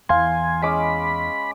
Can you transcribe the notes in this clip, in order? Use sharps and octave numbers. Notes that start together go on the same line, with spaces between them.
E2 E3 F5 G#5 C6
G#3 C#4 B5 D6